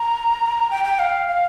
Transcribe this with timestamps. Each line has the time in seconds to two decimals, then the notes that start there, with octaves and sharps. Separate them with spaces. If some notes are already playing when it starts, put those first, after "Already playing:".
Already playing: A#5
0.71 G5
0.84 G5
0.99 F5
1.28 F5